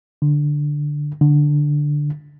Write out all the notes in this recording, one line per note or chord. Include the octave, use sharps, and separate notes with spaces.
D3
D3